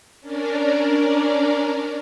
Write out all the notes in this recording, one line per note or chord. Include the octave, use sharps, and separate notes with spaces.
C#4 D4 A#4 D5